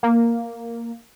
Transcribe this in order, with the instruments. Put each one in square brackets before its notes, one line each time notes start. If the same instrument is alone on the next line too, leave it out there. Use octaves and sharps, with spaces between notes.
[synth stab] A#3